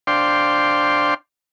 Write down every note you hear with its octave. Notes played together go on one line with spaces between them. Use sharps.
D4 C5 D5 F5 G5 C6